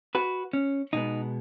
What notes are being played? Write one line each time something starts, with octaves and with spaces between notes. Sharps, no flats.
F#4 B4
C#4
B2 G#3 B3 D#4